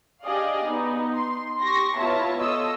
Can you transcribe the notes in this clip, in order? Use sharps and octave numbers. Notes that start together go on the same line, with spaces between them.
D4 G4 G#4 D5 D#5 F5
B3 D#4
C6
G4 C6 C#6 A#6
B3 E4 F4 C#5 E5 A5
F4 A4 C#5 D#5 E6